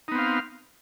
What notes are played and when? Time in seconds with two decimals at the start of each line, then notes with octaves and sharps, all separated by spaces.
0.08 D#4
0.12 B3
0.15 C4
0.18 F5